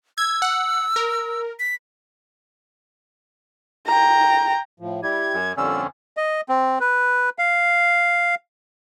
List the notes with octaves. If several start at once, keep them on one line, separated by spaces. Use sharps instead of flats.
E6 G#6
F#5
A#4
B6
G5 A#5
A2 F3
G3 E4 G4 G#6
F#2
F2 A#2 D3 G3 C#4 D5 E6
D#5
C4
B4
F5